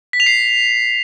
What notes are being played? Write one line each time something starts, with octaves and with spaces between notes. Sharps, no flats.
B6
F7
C7